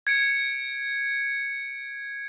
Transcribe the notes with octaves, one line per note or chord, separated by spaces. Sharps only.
G#6 C#7 D7